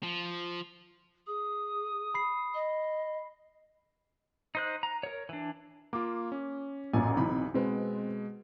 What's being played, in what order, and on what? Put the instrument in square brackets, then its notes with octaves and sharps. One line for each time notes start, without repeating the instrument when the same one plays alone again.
[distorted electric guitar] F3
[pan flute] G#4 [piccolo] D#6
[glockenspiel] B5 C7
[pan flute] D#5
[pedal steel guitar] D#4 C5 F#6
A#5
A#4 C#5
E3 D4
[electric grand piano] A#3 F4 [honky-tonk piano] D6
[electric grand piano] C#4
[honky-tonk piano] A1 F#2 A#2 [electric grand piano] G#5
[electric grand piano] B1 D#4 B5 [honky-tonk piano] C3 E3
[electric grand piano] B2 G#3 [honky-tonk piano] C4 B4